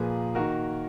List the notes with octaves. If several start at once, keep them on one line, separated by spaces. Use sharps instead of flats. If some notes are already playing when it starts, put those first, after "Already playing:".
Already playing: A#2 F3 A#3 G#4 B4
D#3 A#3 F#4 A#4